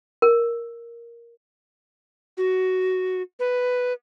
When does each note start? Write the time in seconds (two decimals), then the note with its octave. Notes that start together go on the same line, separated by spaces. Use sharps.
0.22 A#4
2.37 F#4
3.40 B4